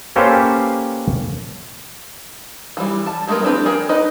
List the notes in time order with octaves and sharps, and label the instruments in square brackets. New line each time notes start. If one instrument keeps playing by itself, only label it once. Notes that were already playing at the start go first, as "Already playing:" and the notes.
[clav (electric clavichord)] A#3 C#4 G4 A4 B4 C5
[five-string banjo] E3 G3
A5
F#3 G#3 A3 B3 A#4
E3 C4 D4 G4 B4
G#4 A#4 G5
D#4 B4 D#5